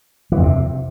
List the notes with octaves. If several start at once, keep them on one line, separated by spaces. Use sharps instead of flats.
E3
F2
C3